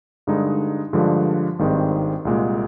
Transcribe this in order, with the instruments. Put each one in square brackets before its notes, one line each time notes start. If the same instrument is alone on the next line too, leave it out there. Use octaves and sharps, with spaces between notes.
[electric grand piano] G2 D3 G#3 D#4
G2 D3 F3 G#3
G#1 G2 D#3 G#3 C4
C2 A#2 G#3